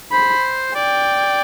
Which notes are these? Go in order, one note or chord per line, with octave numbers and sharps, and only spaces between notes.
C5 B5
D5 G5